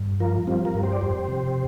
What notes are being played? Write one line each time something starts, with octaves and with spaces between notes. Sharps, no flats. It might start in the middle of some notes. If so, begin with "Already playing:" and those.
Already playing: G2
F3 F4 A#4
G3 C4 F4
F4 A#4
G2
G4 C5
D5
F2 G4 C5
C3